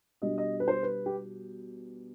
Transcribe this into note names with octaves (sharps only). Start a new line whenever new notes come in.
B2 G3 D4 D#5
D#5
B4
C5
B4
G4